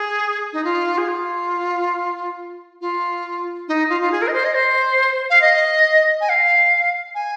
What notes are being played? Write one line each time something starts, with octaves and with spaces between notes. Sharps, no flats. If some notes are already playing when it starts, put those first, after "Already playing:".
Already playing: G#4
D#4
F4
G#4
F4
F4
D#4
F4
F4
G#4
A#4
D#5
C5
D#5
C5
F5
D#5
G#5
F5
G#5